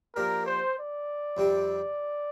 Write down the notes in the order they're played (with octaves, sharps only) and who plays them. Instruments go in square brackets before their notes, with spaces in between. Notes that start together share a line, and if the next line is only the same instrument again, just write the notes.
[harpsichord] F3 A#3 D4 G4 [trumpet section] A#4
[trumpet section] C5
D5
[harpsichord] F2 C3 G3 D4 G4